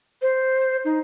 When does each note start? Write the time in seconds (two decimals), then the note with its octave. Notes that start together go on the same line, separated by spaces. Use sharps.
0.22 C5
0.85 D#4